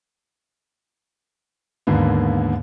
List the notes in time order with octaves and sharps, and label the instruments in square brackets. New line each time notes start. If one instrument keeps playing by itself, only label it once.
[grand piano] D#2 G#2 D3 A#3 B3